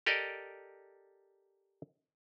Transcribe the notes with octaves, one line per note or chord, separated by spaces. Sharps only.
G4 A4 A#4 D5 D#5